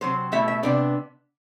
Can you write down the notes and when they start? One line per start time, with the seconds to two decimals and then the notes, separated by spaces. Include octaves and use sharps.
0.01 C3 F#3 C4 C5
0.32 B2 A3 E4 E5
0.48 E5
0.63 C3 F#3 B3 D4 D5